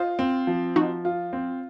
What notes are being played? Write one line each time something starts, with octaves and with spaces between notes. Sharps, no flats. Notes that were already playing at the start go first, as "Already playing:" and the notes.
Already playing: F4 C5 D#5
C4
F3
F3 D#4 F#4
F4
C4